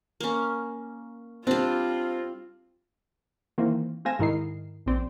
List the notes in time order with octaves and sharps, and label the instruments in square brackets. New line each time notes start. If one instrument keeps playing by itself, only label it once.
[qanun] A#3 C#4
[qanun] G3 D4 [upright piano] C4 [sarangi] F4
[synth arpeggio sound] D#3 E3 A#3 C4
A3 C4 F5 G#5 A#6 E7
G#2 D#3 E4 A#4 D#5 C7
A#1 C4 D5